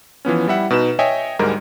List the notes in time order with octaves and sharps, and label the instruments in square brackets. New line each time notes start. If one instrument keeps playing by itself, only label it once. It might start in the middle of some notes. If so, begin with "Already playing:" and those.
[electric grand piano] E3 F3 B3 C#4
G3 E4 E5 F#5
B2 D#4 B4 E7
C#5 D#5 E5 G5 G#5
D2 G#2 G3 G#3 A#4 A#5